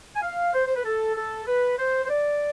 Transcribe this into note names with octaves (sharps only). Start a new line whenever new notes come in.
G#5
F5
C5
C5
B4
A4
A4
B4
C5
C5
D5